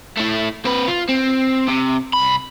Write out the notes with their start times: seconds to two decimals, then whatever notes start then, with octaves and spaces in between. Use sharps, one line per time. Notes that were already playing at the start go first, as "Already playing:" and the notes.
0.17 A3 E4
0.65 C4 B4
0.88 F4
1.09 C4
1.68 C3
2.13 C2 B5